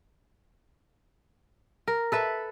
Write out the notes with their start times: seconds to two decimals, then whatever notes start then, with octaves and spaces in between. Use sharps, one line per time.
1.88 A#4
2.12 A4 B4 E5